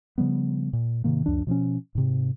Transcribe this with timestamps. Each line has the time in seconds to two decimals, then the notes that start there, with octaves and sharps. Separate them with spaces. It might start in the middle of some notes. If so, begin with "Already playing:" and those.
0.18 C#3 F3 G3 B3
0.73 A#2
1.04 G#2 C3 D#3 A#3
1.26 C#2 F#2 F3 D4
1.47 B2 F3 C4 C#4
1.95 G#2 C3